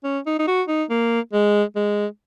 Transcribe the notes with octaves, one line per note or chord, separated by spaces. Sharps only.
C#4
D#4
D#4
F#4
D#4
A#3
G#3
G#3